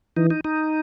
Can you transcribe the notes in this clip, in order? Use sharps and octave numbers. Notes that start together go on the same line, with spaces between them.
E3 D#4
D#4
D#4